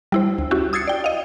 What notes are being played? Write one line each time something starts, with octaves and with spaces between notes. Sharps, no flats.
G3 E4 C5
D2
C#4 E4 F#4 G4
D#6 E6 G#6 A6 C7 C#7
D5 G5
D#5 F5